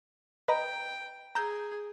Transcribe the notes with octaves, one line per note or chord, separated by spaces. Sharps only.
B4 D#5 G5 A#5
G#4 A#5 E6 G6